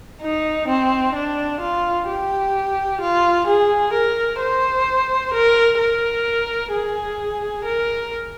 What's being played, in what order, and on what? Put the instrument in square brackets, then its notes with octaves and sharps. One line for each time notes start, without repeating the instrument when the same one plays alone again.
[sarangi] D#4
C4
D4
F4
G4
F4
G#4
A#4
C5
A#4
A#4
G#4
A#4